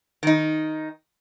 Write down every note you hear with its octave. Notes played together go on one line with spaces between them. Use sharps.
D#3 D#4